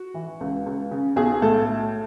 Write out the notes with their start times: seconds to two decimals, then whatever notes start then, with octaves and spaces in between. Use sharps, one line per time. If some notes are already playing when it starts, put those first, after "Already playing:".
Already playing: F#4
0.14 E3
0.41 C#2
0.66 C#2
0.91 C#3
1.16 B1 G#4
1.42 A2 A4